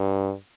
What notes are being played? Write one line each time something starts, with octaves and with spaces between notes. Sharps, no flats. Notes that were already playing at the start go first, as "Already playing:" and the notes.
Already playing: G2